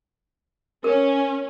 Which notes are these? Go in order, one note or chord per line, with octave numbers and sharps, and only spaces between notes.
C#4 A#4